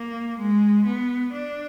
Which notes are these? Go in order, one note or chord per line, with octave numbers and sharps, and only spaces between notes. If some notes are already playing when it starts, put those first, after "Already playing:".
Already playing: A#3
G#3
B3
D4